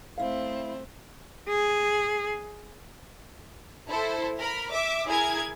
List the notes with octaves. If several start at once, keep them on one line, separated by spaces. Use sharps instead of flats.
A3 C4 E4 F5
G#4
E4 A4 C5
A#4 B5
E5 D6
E4 G#4 A#4 G#6